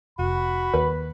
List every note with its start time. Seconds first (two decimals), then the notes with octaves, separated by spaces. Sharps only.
0.19 F1 F#4 B5
0.74 D#2 B4